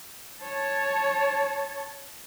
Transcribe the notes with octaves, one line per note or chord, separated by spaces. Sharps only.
C#5 A5